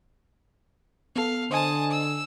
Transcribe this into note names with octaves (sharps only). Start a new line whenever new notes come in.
B3 A4 F5
D3 C5 D#5 G#5 A5 D#6
E6